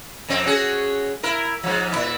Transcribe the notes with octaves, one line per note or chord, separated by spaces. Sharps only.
F2 C4
C#4 F#4 G#4
E4 A#4
G#2 F3
A#2 E4